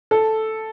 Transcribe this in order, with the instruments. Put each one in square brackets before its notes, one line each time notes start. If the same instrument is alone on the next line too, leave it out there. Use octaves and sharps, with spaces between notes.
[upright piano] A4